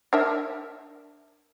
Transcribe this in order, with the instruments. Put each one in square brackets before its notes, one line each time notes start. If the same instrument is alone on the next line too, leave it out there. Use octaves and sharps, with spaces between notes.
[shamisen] D4 A#4 E5